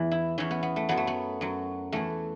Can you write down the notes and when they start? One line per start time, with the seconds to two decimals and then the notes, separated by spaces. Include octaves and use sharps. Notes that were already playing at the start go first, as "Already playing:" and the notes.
Already playing: E2 E3
0.11 E4
0.38 E2 E3 C#4
0.51 B3
0.63 B3
0.76 A3
0.89 F#2 F#3 B3
0.97 A3
1.07 B3
1.41 F#2 F#3
1.92 E2 E3 A3